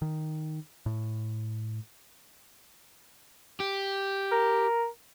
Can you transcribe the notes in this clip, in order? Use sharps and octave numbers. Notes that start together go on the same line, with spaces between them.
D#3
A2
G4
A#4